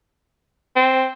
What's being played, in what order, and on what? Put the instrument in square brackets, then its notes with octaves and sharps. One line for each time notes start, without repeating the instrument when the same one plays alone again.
[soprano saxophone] C4